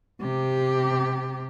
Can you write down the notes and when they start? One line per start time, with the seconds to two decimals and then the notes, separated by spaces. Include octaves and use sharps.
0.22 C3 G4